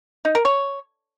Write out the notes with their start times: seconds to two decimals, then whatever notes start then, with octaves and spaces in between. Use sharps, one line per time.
0.25 D#4
0.35 A#4
0.45 C#5